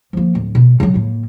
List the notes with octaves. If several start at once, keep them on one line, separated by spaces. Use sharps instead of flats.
F3 A#3
D1
B2
C#3 F#3
A2 A#3